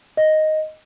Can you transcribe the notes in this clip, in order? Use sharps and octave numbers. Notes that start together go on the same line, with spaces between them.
D#5